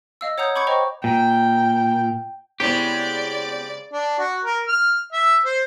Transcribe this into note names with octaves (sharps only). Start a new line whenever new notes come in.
D#5 F5 E6
C#5 F#5 A#5 D#6 G6
B5 C#6 D6 G6 G#6 C#7
C5 D#5 G5 A#5 C#6
A#2 G5
C#3 G#3 B3 C4 E4 G4 G#4 D5
D4
F#4
A#4
F6
E5
C5